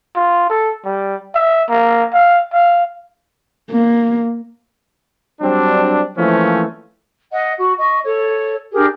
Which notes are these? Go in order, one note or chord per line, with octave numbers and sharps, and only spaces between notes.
F4
A4
G3
E5
A#3
F5
F5
A#3
F#3 G3 C4 D4
E3 F3 A3 A#3 C4 C#4
D#5 F#5
F#4
D#5 C#6
A4 C#5
D4 G4 G#4 A#4